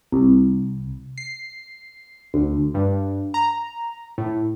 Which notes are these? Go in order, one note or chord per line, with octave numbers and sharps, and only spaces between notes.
C2
C7
D2
G2
A#5
A2